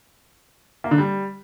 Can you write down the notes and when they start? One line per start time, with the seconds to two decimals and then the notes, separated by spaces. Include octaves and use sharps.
0.84 A#3
0.91 D3
0.98 G3